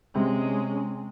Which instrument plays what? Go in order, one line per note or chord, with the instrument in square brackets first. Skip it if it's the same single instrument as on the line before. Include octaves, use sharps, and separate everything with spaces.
[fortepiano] C3 [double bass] G#3 [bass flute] C#4